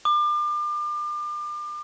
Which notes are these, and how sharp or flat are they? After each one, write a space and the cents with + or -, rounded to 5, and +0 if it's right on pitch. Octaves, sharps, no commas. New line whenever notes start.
D6 +35